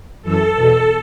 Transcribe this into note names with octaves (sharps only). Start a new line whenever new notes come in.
F#2 E3 A4
E2 B2